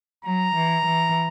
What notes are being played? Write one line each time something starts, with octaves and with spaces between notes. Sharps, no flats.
F#3 A#5
E3
E3